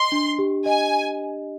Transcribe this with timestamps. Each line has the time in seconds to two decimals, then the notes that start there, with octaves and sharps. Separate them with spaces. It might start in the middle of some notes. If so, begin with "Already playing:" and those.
Already playing: D#5 C6
0.12 D4
0.39 G4
0.66 D#5 G#5